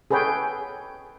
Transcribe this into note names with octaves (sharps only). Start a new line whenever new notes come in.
G#4 A4 B4 C#5 G5 G#5